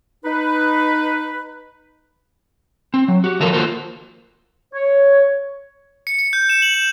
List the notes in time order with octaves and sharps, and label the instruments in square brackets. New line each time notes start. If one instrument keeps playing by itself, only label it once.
[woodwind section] D#4 B4
[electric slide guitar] C4
F#3
F#4 G4
D#3 F3 F#3 A4 A#4
A#3 F4 F#4 A4 A#4 C5
[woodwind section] C#5
[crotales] C#7
C#7
G6
E7
F#7
E7